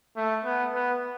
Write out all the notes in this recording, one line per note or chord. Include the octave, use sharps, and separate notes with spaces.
A3
B3
B3